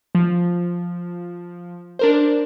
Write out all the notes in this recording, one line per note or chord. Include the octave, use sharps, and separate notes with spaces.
F3
D4 A#4 C5